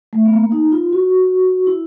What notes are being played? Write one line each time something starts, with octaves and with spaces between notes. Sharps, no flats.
A3
B3
A#3
D#4
F4
F#4
E4